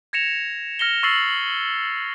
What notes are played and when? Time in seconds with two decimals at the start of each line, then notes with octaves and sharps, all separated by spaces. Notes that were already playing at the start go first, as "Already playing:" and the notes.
0.13 G#6 A#6 C#7 E7 F7
0.79 F6 A#6 C#7 G7
1.03 C#6 E6 A6 C7 F#7